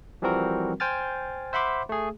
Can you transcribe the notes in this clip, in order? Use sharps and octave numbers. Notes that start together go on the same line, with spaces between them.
E3 F3 G3 C4 F#4 A#4
C5 G5 G#5 F6 A6
C5 E5 F#5 B5 C6 D6
A3 G#4